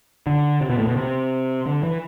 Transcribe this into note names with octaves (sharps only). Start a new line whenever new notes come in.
D3
C3
B2
A2
B2
C3
D3
E3